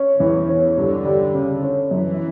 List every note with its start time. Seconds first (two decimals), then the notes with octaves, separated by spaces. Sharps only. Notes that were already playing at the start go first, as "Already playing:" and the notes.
Already playing: C#4
0.20 E2 E3
0.49 C#4
0.77 G2 D3
1.06 G3
1.34 C#3
1.63 C#4
1.91 F#2 E3